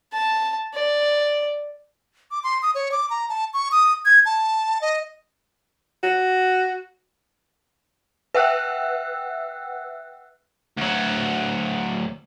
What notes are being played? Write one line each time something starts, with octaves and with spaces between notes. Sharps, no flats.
A5
D5
D6
C6
D#6
C#5
D6
A#5
A5
C#6
D#6
G#6
A5
D#5
F#4
B4 E5 F#5 G5 E6 F#6
D2 F#3